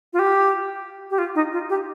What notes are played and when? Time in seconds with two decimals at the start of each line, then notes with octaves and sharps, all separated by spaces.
0.13 F4
0.19 G4
1.11 G4
1.18 F4
1.35 D#4
1.53 F4
1.70 G4